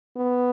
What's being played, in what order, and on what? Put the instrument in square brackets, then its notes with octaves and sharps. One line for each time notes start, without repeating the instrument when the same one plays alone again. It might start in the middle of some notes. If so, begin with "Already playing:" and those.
[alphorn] B3